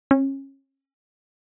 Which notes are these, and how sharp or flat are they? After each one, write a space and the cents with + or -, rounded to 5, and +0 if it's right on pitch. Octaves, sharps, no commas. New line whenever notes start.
C#4 -30